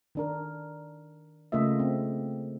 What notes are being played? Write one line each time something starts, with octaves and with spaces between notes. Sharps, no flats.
D#3 D4 A#4
C#3 A3 A#3 F4 D#5 E5
C4